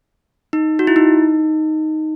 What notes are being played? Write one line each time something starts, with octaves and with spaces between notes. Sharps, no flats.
D#4
F#4
E4
D#4